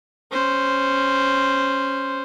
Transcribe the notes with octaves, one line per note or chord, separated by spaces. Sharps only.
C#4 C5